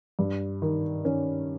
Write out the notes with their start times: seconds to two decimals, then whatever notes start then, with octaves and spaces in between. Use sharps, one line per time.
0.19 G2
0.62 D#3
1.05 D#3 C#4